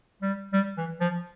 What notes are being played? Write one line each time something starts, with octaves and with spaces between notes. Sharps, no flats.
G3
G3
E3
F3